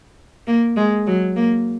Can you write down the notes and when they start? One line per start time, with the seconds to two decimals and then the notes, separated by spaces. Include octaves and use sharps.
0.47 A#3
0.77 G#3
1.07 F#3
1.36 A#3